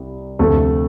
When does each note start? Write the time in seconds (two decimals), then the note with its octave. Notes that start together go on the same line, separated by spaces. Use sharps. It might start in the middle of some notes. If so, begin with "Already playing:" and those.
Already playing: C2
0.39 D2 C3 F3 A3 A4